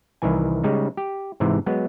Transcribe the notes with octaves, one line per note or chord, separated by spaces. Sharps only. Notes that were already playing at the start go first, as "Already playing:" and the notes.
C2 D#3 E3 G#5
C#3 G3 G#3 D#4
G4
G#2 C3 E3
F#3 G#3 B3